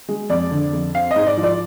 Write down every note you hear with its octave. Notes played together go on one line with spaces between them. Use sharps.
G#3
F2 D5
D3
F2
C4 F5
D#5
G#2
D5
F3
D5